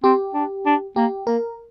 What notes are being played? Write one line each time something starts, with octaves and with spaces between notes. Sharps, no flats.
C4 G4
D4
D4
A#3 G4
A#3 A#4